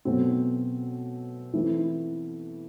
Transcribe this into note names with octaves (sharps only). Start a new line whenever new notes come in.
B2 F#3 A3 C4
E3 A3 C4